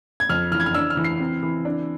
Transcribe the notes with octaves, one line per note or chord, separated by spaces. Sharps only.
G#6
F2 F6
E3 F6
G#6
F6
D4 E6
F6
E3
C7
C4
E3
D4